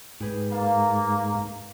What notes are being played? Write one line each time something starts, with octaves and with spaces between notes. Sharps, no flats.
G#2 G4 G#4 B4
A#3 F5 A5 A6